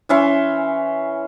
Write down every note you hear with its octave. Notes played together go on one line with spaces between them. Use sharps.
E3 C#4 E5 C6